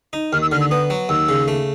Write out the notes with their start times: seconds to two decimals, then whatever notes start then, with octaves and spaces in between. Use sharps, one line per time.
0.13 D#4
0.33 D#2 F6
0.42 E6
0.52 D3 F6
0.61 E6
0.71 B3 D#6
0.90 F#3
1.09 D#2 E6
1.29 C#3
1.48 A3